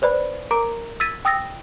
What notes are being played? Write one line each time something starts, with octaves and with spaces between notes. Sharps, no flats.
B4 C5 D5 B5
A#4 A#5 D6 D7
E6 G#6 A6 B6 D#7
G5 D#6 E6 A6 A#6